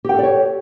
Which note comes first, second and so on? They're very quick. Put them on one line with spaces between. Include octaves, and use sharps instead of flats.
G4 G5 A4 D5 C#5